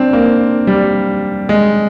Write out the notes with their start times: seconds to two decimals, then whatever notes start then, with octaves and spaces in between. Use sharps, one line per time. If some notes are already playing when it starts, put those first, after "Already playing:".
Already playing: G3 C4 D4
0.13 A#3
0.67 G3
1.49 G#3